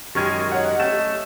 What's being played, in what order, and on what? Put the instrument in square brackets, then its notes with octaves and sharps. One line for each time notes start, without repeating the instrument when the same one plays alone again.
[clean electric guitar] F#2 D#3 G#3 [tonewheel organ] G4 [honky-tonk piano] C#6 F6 G#6
[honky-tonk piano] C#5 F#5 [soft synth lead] D#5
[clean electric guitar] A3 [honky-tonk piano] C#4 E7